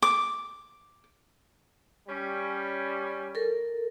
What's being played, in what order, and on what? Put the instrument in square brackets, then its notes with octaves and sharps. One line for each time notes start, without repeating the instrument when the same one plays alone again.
[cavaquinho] D6
[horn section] G3 C#4
[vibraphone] A4 A#4